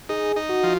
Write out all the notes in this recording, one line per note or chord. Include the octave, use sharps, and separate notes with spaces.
D#4 G#4
D#4
F#4
F3